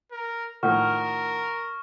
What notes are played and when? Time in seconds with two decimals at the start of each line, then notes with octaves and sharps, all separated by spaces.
0.12 A#4
0.63 A2 D#3 F3 A#4 F#5 C#6 F6